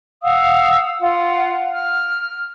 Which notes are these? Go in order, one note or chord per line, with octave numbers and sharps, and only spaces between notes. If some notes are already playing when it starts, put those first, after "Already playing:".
F5 F#5 D#6 E6
F4 F#5
F6